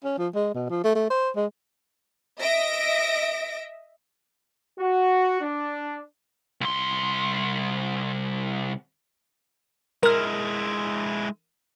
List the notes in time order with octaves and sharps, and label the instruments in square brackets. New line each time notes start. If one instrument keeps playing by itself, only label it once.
[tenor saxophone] C#4
F3
G#3
B2
F3
A3
A3
C5
G#3
[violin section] D#5 E5 A#6 D7
[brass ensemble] F#4
D4
[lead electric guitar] C2 C6
[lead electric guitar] G#3 E4 [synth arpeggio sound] A#4 F6